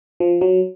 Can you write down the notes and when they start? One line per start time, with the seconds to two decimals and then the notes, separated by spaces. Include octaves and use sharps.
0.20 F3
0.41 F#3